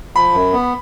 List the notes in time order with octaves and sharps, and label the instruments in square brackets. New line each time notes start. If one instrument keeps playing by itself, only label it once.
[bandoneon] F3 [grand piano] B5
[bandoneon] F#2
B3